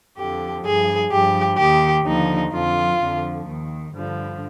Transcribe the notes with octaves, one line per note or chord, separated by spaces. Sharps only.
F2 D3 F3 G4
G2 F3 G#4
G2 F3 G4
D#2 D#3 G4
D#2 D3 F3 D#4
F2 D3 F3 F4
F2 D3 F3
D#2 D#3
G2 D3 F3